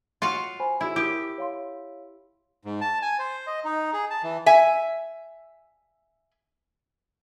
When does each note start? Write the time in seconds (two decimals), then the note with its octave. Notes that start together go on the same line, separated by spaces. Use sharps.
0.22 F4 F#4 F5
0.60 C5 G#5 B5
0.81 E4 F#4 G#4 A#4
0.96 E4 G4 A#4 D#6
1.38 C#5 F5 C6
2.65 G#2
2.81 A5
3.02 G#5
3.19 C5
3.47 D#5
3.65 D#4
3.93 G#4
4.10 A5
4.23 E3
4.46 E5 G#5